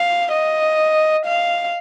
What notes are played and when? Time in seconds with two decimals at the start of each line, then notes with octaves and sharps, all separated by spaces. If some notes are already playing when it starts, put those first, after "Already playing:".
Already playing: F5
0.32 D#5
1.26 F5